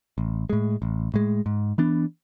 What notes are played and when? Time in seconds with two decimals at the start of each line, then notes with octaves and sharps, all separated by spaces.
0.18 A1
0.50 A2 G#3
0.82 A1
1.14 A2 G#3
1.46 G#2
1.78 E3 B3 D4